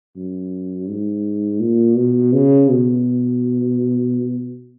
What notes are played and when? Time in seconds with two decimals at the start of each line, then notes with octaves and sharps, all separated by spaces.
0.16 F#2
0.88 G#2
1.60 A#2
1.97 B2
2.33 C#3
2.70 B2